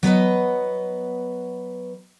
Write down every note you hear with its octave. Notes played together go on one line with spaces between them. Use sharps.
F#3 B3 B4 D#5